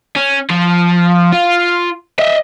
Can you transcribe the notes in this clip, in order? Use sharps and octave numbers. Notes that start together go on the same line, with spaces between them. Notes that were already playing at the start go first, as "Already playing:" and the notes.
C#4
F3
F4
D#5 E5